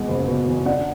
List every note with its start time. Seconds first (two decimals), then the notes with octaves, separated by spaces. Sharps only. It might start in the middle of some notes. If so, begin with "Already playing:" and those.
Already playing: E2 B2 G#3 F#5
0.08 F#1
0.28 B2
0.47 E2
0.66 D4 F#5